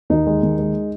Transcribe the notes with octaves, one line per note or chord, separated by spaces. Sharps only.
D#2 D#4
G#3
D#2
G#3